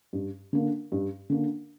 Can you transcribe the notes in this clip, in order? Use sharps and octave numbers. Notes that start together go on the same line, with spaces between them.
G2
D3 A#3
G2
D3 A#3